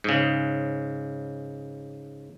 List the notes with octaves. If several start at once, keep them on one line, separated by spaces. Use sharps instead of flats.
G#2 C#3